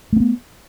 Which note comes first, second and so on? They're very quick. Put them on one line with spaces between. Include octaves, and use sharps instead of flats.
A3 C4 B3